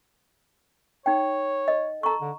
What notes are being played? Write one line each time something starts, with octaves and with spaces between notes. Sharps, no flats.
D#4 C#5 G5
D#5
A4 A#5 C#6
D3